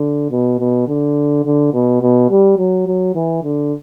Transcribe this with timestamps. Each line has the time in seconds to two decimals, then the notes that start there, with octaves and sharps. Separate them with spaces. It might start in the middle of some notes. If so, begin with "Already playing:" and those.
Already playing: D3
0.31 B2
0.59 B2
0.88 D3
1.45 D3
1.74 B2
2.02 B2
2.30 G3
2.58 F#3
2.87 F#3
3.15 E3
3.43 D3